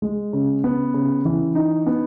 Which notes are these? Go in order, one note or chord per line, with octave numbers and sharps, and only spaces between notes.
G#3
C#3
B3
C#3
E3
D#4
B3